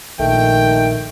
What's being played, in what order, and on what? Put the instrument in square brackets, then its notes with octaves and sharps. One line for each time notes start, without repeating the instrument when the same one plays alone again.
[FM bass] A#1 [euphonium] D#3 [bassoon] A3 [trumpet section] G5